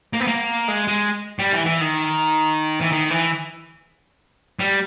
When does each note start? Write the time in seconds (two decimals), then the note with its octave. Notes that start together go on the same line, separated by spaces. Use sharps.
0.13 A#3
0.20 B3
0.27 A#3
0.68 G#3
0.88 G#3
1.39 G3
1.53 E3
1.66 E3
1.81 D#3
2.81 E3
2.92 D#3
3.10 E3
4.60 G3